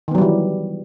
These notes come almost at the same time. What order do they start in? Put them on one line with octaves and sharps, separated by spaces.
D#3 B3 F#3 G3 E3